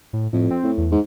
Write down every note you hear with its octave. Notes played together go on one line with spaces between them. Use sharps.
A2
F2 A2
C4
A2
E2
G#2